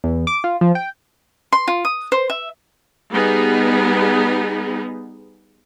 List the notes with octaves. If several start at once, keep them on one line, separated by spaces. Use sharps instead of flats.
E2
D6
F4
F3
G5
C6
F4
D#6
C5
E5
G3 B3 D#4 G#4